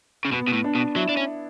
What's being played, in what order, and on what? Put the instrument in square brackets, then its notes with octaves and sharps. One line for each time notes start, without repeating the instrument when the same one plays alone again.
[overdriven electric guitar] C#3
[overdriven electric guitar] B2 [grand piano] B3
[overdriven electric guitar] B2
A2
[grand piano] D4
[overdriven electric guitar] B2
[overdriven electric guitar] F#3 [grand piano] E4
[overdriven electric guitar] D4
C#4